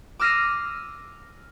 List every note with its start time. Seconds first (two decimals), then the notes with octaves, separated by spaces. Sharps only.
0.19 D6 E6 F6 A#6 C7 D#7